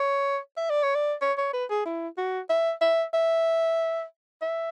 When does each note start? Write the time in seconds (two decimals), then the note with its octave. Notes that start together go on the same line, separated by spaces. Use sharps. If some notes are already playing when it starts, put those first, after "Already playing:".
Already playing: C#5
0.57 E5
0.70 D5
0.83 C#5
0.95 D5
1.21 C#5
1.38 C#5
1.53 B4
1.70 G#4
1.85 E4
2.17 F#4
2.49 E5
2.81 E5
3.14 E5
4.42 E5